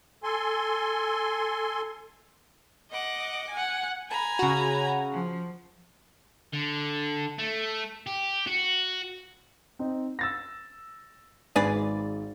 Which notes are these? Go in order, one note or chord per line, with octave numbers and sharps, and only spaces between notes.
A4 G#5 C6
D#5 F#5 D6
F#5 G#5
G#5 A#5 B5
C#3 F#4
F3
D3
A3
G4
F#4
C4 D#4
E6 A6 A#6
G#1 G#2 G#4 B4 D5 A6